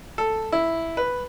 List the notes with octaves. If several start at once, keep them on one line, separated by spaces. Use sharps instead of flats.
A4
E4
B4